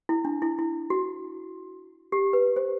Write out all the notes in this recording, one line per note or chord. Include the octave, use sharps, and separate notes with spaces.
E4
D4
E4
E4
F#4
G4
B4
C5